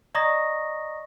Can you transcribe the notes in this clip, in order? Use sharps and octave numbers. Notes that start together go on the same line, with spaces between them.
D5 D#5 A#5 C#6 D#6 A#6